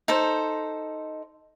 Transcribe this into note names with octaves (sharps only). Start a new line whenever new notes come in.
D#4 A4 C5